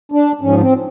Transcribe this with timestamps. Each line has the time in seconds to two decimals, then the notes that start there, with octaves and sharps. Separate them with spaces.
0.12 D4
0.41 G#2 F3 C#4
0.60 C4